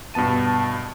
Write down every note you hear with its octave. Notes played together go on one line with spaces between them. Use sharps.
G2 B2 B3 A5 D#7